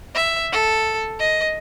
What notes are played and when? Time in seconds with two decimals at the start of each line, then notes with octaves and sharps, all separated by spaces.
0.15 E5
0.53 A4
1.19 D#5